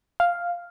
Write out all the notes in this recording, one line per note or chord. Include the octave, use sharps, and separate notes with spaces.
F5